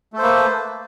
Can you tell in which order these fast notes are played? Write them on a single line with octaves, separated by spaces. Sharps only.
A3 A4 C5 A#3 B4